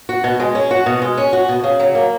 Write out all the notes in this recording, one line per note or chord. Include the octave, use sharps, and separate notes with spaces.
F#4
B2
G#3
C#4
F#4
B2
G#3
C#4
F#4
B2
C#3
F#3
A#3